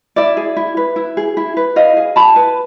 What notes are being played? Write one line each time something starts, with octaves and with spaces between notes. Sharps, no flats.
E4 D5 E5
G#4
E4
B4
E4
G#4
E4
B4
E4 D#5 F5
G#4
E4 A5 B5
B4